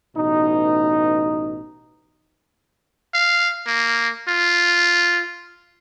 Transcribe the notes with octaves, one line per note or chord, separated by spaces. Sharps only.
A1 B2 D#4
F5
A#3
F4